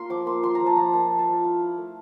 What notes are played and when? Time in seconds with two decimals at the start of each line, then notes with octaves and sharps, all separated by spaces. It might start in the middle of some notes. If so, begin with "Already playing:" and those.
Already playing: A#3 F4 A#5 C6
0.10 F3 D6
0.26 A#3 C6
0.43 F4 C6
0.55 A#5
0.60 F3
0.66 A5
0.76 F3 A#5
0.93 A#3 A5
1.11 F4
1.19 A5
1.27 F3
1.44 E4 F5
1.61 E4
1.78 A3